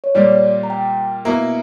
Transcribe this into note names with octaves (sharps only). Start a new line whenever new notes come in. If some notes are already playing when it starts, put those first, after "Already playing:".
C#5
A#2 G3 A#3 D5
A#5
G5
B2 A#3 E4 A#5